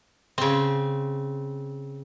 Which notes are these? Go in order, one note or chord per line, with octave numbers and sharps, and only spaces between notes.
C#3 C4